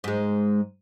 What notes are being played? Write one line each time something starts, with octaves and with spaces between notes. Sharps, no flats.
G#2 G#3